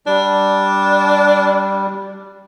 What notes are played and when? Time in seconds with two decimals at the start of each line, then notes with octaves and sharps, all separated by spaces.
0.07 G3 D4